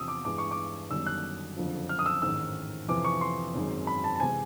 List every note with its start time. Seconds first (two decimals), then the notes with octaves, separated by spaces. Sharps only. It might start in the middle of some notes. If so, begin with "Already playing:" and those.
Already playing: E2 C3 F3 D#6 E6
0.08 D6
0.25 G2 E3 G#3 D6
0.38 C#6
0.51 D6
0.91 G1 F#2 D#3 G3 E6
1.06 F#6
1.57 F#1 F2 D3 F3
1.89 F6
1.99 D#6
2.06 E6
2.22 A1 G#2 D#3 E6
2.88 F2 C3 E3 D6
3.05 C#6
3.21 C6
3.54 G#1 F#2 D#3 G#3
3.87 B5
4.04 A5
4.16 A5
4.20 C3 E3 G#3 C4 G#5